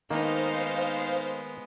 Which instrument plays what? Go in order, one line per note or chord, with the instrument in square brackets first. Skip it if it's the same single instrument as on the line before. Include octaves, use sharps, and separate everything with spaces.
[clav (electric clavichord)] D#3 A#3 [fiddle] G#3 B3 [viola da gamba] D#4 [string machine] C5 F5